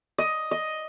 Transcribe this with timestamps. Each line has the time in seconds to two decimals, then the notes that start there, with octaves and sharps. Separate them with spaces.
0.18 D#5
0.51 D#5